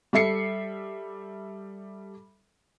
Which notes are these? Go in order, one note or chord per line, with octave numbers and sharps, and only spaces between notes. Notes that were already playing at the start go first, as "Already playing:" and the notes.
G3 A4 E5 C7 C#7